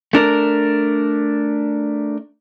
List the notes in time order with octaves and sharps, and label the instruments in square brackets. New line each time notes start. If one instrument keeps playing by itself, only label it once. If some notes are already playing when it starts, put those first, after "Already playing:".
[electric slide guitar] A3 D4 A#4